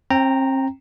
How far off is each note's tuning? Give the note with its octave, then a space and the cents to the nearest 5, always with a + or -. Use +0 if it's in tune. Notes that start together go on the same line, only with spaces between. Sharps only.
C4 +40 G5 +0 A#5 -10